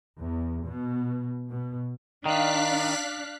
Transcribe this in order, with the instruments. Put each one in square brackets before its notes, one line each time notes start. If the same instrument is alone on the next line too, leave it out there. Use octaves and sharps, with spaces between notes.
[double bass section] E2
B2
B2
[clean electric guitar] D#3 [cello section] D4 [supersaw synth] F5 F#6 B6